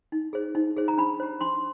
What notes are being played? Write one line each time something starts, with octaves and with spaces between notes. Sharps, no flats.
D#4
G#4 C5
D#4
G#4 C5
A#5
D4 B5
G4 C5
D4 C6